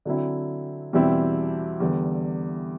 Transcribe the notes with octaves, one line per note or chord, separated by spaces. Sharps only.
D3 F#3 C4 E4
E2 B2 G3 C4 E4
E2 D3 G3